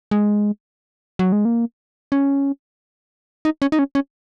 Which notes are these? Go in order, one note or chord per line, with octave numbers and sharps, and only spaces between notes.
G#3
F#3
G#3
A#3
C#4
D#4
C#4
D#4
C#4
C#4